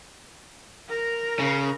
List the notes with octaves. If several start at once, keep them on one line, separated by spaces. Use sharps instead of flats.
A#4 A#5
C#3